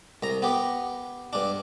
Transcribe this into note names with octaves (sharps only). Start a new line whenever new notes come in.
C2 A#5
B3 G4
G2 D4